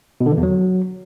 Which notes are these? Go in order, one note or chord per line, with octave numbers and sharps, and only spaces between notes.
B2
D3
E3
E2
F#3